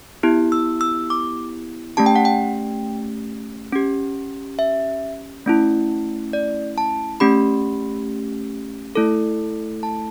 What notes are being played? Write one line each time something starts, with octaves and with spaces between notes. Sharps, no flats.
B3 E4 G4
E6
E6
D6
A3 C#4 G4 A5
G5
F#5
G5
C#4 G4
E5
A3 C#4 E4
D5
A5
A3 C#4 G4 B5
A3 E4 A4
A5